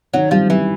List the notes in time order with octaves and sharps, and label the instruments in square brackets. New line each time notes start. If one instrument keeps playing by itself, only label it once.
[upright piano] D#3 [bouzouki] F#3
[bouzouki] F3 [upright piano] G3
[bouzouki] E3 [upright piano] G3